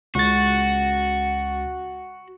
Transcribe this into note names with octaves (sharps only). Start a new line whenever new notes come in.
C#2 F#4 A6